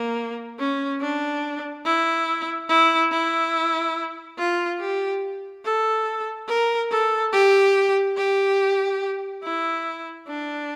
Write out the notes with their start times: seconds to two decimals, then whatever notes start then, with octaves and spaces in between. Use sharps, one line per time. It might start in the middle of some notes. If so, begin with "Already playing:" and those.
Already playing: A#3
0.59 C#4
1.01 D4
1.85 E4
2.69 E4
3.12 E4
4.38 F4
4.80 G4
5.65 A4
6.48 A#4
6.91 A4
7.33 G4
8.17 G4
9.44 E4
10.28 D4